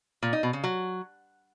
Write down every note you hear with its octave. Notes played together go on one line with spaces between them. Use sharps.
A#2
D#4
B2
C#3
F#3